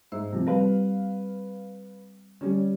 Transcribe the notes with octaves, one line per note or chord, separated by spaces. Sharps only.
G#2 C5 E5 E6
C3 F3
G3 C4 G4 B4 F5
D3 G3 C#4